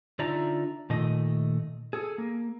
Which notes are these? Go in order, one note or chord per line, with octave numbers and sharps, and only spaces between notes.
D3 D#4 F4 D5 E5 A#5
A#2 D#3 A3 D#5
G#4 A4
A#3